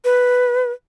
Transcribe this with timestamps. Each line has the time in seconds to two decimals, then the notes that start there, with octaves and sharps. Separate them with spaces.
0.05 B4